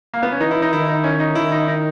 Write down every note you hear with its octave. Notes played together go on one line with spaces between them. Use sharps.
A#3
B3
C#4
E3 D#4
E4
D#4
D#3 E4
D#4
C#4
D#4
D#3 E4
D#4
D#4